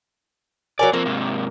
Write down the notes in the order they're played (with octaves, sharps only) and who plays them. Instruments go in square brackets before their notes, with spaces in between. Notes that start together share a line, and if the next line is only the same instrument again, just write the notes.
[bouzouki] F#3 A#4 G#5 [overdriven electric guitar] D5
[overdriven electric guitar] F3 C4 [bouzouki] A#3
[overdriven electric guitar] G#2 C3